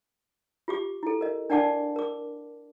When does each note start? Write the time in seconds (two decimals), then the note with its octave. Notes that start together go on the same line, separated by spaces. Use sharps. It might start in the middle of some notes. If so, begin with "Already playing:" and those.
0.68 F4 G4 D6
1.03 E4 A4
1.21 A#4 D#5
1.50 D4 A#4 D5 F#5 A5 D6
1.96 A#4 D6